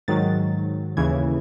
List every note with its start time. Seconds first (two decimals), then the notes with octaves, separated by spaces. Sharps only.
0.08 G#2 D#3 F#3 A6
0.97 D#2 C#3 E3 G#6